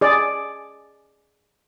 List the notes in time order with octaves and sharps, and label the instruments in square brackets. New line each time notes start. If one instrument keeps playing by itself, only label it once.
[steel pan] G#4 D5